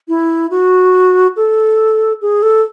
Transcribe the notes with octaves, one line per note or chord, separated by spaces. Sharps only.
E4
F#4
A4
G#4
A4